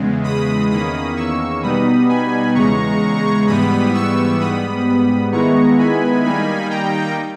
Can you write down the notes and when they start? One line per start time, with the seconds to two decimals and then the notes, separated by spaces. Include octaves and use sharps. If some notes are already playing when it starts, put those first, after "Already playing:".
Already playing: E2 C#3 G#3
0.24 B5 D#6
0.70 E2 D#3 A#3 C#4 B5 D#6
1.17 C#6 E6
1.63 B2 G3 B3 D#4 B5 D#6
2.09 G#5 B5
2.55 E2 C#3 G#3 A#5 C#6
3.47 G#2 E3 G3 B3 B5 D#6
3.94 C#6 E6
4.40 G#2 G3 B3 B5 D#6
5.32 D#3 G#3 B3 E4 A#5 C#6
5.78 G#5 B5
6.24 D#3 G3 A#3 D#4 G#5 B5
6.70 G5 A#5